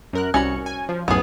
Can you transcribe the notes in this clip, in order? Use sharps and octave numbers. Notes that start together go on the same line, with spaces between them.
F#2 A#4 F#6
C2 C#4 F#4 B5 C#7
G#5
F3
B1 F#2 A2 B3 G#4